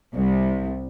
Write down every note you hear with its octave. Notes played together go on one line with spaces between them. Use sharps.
C2